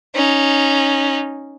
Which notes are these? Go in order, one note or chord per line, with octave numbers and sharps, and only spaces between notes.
C#4 D#4